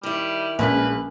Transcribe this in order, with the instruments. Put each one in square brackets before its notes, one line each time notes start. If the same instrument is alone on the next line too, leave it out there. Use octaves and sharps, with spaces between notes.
[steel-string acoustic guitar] D#3 E4 [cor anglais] G3
[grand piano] A#1 [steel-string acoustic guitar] G2 G#3 A#3 [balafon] C#4 A#4 [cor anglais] B4